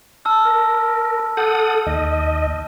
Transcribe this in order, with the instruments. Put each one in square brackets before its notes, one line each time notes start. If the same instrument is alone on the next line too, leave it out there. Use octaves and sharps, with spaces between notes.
[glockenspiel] A5 E6 F6
[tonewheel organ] A#4
[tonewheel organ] A4 F#5 D#6 [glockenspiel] F6 G6
[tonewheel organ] D#2 D#5